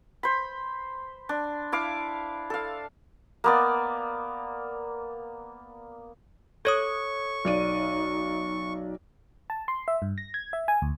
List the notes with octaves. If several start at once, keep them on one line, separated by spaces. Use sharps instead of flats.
C5 B5
D4
E4 F5 D6
A4 F5
A#3 B3 D5
A4 C#5 C#6 D#6 G#6
B1 D#4 D5 D#7
A5
C6
E5
G2
A#6
G#6
E5
G#5
D2